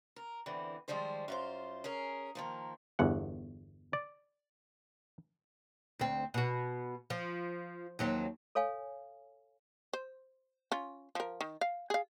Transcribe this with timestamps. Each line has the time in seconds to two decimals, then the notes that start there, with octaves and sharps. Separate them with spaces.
0.16 A#4
0.46 E2 D3 E3 C4
0.88 D#3 F3 G3 G#3 C5
1.28 F#2 F4 C5
1.84 C#4 G#4 A#4
2.35 D#3 F3 A#3
2.99 G1 E2 F#5
3.93 D5
5.99 D2 C4
6.34 B2 F#4
7.10 F3
7.99 D#2 F#3 C4
8.55 A4 C#5 F5 G#5
9.93 C5
10.72 C#4 F4
11.15 F3 A#4
11.41 D#3
11.61 F5
11.90 G#4 F5